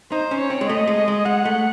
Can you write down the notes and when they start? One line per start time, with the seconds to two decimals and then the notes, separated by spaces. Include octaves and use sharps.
0.12 D#4 C5
0.31 C#4
0.40 C#5
0.50 C4
0.61 G#3
0.69 A3 D#5
0.87 G#3
1.08 G#3
1.26 G#3 F#5
1.45 A3